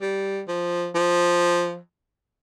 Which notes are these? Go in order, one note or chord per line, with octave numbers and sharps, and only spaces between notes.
G3
F3
F3